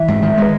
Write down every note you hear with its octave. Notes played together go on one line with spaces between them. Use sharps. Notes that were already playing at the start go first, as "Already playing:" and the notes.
Already playing: E3 E5
G#2
D#3
G#3 B4